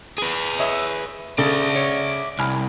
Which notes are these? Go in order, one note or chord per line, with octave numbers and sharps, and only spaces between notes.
G#4 B4
C#5 D#5 E5
C#3 A4 D5 E5
C#5
C2 G#5 B5 F6